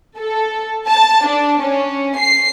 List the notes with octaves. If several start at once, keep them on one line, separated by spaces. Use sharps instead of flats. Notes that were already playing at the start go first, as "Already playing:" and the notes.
A4
A5
D4
C#4
C7